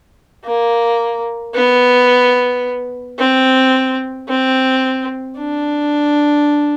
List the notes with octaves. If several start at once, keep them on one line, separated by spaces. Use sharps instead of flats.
A#3
B3
C4
C4
D4